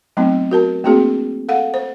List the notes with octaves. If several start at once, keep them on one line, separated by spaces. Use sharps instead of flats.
F#3 A3 B3 C4 D#4
F#4 A#4 A5
A3 A#3 C4 D4 F#4 G#4
A4 F5 F#5
C5